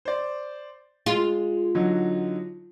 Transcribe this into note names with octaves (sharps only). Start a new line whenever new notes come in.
C5 D5
G#3 F4
D3 F#3 D#4